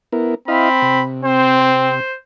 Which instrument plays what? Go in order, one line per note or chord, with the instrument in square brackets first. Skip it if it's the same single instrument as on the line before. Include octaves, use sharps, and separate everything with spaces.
[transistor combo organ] B3 E4 A#4
[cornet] C4 [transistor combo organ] E4 D#5 F5 [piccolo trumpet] B5
[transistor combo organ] C3
[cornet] C4 [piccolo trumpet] C5
[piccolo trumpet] C5